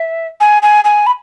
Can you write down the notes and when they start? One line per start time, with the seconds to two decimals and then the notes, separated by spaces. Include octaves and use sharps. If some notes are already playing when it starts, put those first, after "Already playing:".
Already playing: E5
0.40 G#5
0.62 G#5
0.84 G#5
1.07 B5